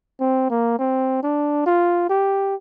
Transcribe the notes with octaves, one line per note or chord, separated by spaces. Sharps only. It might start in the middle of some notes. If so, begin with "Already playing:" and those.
C4
A#3
C4
D4
F4
G4